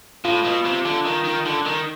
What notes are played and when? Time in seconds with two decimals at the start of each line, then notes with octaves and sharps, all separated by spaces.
0.25 A2 F4
0.45 B2
0.65 C3
0.85 D3
1.05 D#3
1.25 D#3
1.45 D3
1.65 D#3